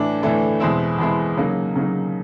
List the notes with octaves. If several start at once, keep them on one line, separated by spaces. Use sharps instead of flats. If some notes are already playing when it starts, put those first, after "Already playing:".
Already playing: A2 E3 A3 D4
A2 E3 A3 D4
E2 B2 G#3 C4 E4
E2 B2 G#3 C4 E4
C#3 F#3 A#3 D#4
C#3 F#3 A#3 D#4